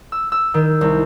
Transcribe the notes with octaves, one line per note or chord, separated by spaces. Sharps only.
E6
E6
D#3
C2